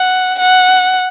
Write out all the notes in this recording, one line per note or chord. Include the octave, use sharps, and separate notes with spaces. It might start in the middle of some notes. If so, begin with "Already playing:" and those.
Already playing: F#5
F#5